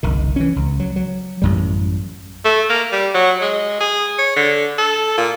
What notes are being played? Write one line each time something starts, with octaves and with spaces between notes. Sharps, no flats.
F#1 C2 D#3
E3 C#4
C#2
F#3
F#3
A1 F#2 G3
A3
A#3
G3
F#3
G#3
G#4
C#5
D3
A4
A#2